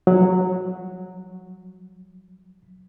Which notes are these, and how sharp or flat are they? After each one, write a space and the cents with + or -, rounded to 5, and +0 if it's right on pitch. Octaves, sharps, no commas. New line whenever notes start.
F#3 -10